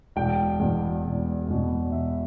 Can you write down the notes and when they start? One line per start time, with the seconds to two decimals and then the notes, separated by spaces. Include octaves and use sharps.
0.16 E1 G5
0.60 E2 B2
1.04 E1
1.48 E2 B2
1.92 E1 E5